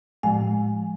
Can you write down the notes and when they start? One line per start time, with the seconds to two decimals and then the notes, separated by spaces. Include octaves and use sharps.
0.23 A2 F3 G#3 G#5